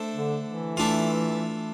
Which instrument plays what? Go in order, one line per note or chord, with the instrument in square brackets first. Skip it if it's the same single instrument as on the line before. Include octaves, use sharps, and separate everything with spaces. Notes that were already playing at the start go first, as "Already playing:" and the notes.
Already playing: [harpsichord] A3 D4 A4 C5
[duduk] D3
E3
[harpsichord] A3 D4 F4